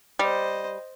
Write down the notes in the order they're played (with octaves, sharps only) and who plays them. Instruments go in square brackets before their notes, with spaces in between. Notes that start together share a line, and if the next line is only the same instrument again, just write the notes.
[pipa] G3 [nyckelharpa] C5 D#5